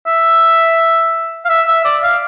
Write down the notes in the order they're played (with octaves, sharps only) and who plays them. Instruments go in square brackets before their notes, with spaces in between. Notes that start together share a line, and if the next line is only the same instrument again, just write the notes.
[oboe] E5
F5
E5
E5
D5
F5